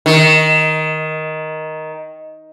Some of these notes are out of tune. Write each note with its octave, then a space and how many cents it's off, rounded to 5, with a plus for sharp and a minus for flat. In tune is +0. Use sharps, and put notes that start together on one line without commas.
D#3 +10